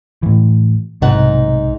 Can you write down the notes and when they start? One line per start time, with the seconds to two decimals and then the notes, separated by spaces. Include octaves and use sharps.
0.23 A2 E3
1.02 B1 G#2 C3 D#4 F#5